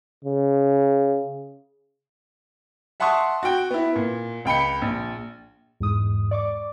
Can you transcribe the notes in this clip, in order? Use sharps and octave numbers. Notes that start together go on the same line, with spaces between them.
C#3
E5 F#5 A5 C6 C#6 D#6
F#4 G5
B3 E4
A#2
C#2 G5 B5 C#7
A#1
E2 G#2 G#3 D#6
D5 C#6 D6